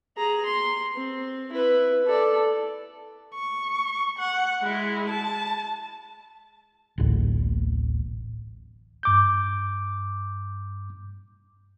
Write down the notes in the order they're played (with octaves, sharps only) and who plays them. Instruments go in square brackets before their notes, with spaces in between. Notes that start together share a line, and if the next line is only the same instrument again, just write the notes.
[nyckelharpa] G#4 A#5
C6
C4
E4 B4
A4 D5
[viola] C#6
F#5
G#3 E4
A5
[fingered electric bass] D1 A1
[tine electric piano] G2 D6 G6